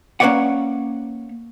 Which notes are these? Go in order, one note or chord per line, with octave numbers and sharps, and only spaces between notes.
A#3 C#4 B4 C#5 D5 F#5